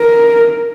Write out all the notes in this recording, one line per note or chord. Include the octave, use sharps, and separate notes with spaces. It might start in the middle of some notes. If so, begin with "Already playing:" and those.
Already playing: A#4